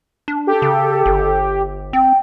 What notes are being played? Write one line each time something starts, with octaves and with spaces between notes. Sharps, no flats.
D4
G4 A4
C#3
G1
C4 G5